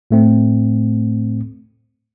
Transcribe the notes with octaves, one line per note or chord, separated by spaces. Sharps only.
A2 A3 C4